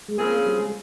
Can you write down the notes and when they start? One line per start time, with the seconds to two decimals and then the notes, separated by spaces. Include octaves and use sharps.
0.08 G#3
0.18 C#3 F3 A#3 C4 F4 G#4
0.46 G3
0.59 G#3